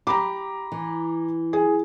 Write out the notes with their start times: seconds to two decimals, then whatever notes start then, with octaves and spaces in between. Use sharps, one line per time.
0.07 G4 A#5 B5 D6
0.72 E3
1.53 G#4